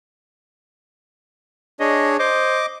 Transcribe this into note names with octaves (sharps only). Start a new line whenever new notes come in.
D4 G#4 C#5 D#5
C5 D#5 D6